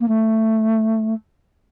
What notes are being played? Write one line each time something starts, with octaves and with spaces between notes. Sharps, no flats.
A#3
A3